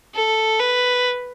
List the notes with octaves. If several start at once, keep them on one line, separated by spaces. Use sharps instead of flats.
A4
B4